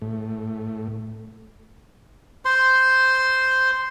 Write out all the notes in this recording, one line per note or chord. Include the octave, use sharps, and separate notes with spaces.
A2
C5 C6